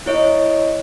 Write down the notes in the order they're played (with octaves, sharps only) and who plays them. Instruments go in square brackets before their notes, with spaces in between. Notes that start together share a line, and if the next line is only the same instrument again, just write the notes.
[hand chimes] E4 C#5 D#5